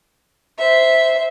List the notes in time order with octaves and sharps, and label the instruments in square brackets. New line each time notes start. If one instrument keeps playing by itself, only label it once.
[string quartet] C5 E5